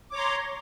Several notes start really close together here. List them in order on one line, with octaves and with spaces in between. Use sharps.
D6 C#5 A#5 C6